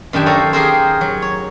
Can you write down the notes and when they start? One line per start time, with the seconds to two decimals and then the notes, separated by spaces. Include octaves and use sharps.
0.13 F#2 D#3 D4 G4 G#5
0.26 A4 C5 C#5 F5 G#5 A#5
0.53 G4 G#4 A#4 C5
1.01 F#3
1.22 C#5